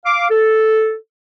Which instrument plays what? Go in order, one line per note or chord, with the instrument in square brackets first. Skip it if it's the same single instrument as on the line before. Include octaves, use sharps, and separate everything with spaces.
[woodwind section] F5 D6
A4